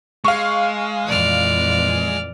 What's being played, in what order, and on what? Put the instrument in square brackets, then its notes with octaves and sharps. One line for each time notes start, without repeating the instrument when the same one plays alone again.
[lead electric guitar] G#3 [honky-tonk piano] F5 C#6
[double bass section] F2 A#2 E3 [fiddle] D5 F6